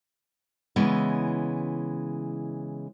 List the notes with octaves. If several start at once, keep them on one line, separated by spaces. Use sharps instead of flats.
C#3 E3 G#3 B3 E4 B4